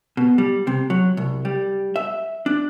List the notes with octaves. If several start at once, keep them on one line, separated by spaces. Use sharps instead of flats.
B2
G3
C3
F#3
C2
G3
E5
D4